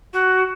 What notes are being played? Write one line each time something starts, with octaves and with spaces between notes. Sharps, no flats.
F#4